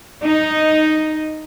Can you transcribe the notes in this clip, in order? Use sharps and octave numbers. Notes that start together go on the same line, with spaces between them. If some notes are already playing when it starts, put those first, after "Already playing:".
D#4